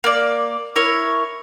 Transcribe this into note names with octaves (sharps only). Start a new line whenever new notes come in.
A#3 D5
E4 A#4 C#5